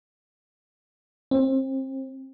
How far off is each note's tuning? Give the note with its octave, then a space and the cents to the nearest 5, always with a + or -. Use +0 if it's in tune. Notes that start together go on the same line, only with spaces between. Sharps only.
C4 +30